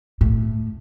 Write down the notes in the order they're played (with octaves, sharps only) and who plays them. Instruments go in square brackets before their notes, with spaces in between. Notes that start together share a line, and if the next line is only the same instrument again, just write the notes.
[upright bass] A2